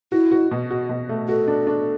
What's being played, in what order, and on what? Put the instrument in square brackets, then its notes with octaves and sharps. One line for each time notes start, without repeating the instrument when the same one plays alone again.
[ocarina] E4 [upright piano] F#4
[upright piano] F#4
B2
F#4
B2
A3
[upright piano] F#4 [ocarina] A4
[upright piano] D4
D4